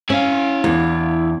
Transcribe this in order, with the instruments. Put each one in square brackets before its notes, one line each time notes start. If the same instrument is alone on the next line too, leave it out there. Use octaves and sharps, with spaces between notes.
[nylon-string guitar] C#4 [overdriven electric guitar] E4 F5
[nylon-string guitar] E2 D4